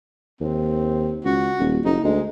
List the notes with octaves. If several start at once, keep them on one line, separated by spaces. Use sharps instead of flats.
D#2 C4
C#2 F#4
D#1
F#1 D#4
D2 G#3